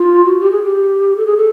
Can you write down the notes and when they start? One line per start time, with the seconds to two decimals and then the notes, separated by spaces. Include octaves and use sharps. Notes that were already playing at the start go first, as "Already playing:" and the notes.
Already playing: F4
0.25 F#4
0.40 G4
0.51 G#4
0.63 G4
1.17 A4
1.26 G#4
1.37 A4